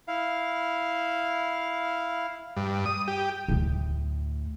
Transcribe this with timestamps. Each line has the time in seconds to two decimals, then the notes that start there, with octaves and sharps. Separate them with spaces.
0.08 E4 F5
2.57 G2
2.86 D#6
3.08 G4
3.48 D2 A2